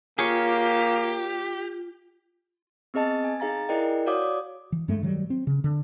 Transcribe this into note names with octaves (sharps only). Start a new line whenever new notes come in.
A#3 F4 G4 G#4 C#5
B3 C4 G#4 D#5 A5 A6
G#5
D#4 G#4 F5 A#5 A6
E4 G#4 A#4 D5 D#5 G5
F#4 C#5 D5 F5 D6 D#6
E3
G2 G#3 A3
D#3 F#3 G3
C4
C#3
D3